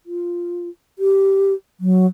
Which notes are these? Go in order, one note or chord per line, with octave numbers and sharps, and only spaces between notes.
F4
G4
F#3